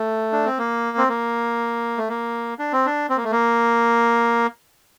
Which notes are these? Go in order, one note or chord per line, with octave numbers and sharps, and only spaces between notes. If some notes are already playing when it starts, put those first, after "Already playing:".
Already playing: A3
D4
C4
A#3
C4
A#3
A3
A#3
D4
C4
D4
C4
A#3
A3
A#3